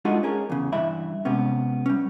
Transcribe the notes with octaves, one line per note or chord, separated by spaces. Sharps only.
G#3 A3 D4 D#4 F4 F#4
C#4 G#4 A#4
E2 C#3
G2 E3 E5 B5
C3 G#3 B3 C#4
G3 C#4